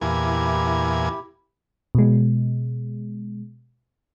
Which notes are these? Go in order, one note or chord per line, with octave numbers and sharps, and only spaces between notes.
E2 A#2 E4 G4 G#5
B2 G#3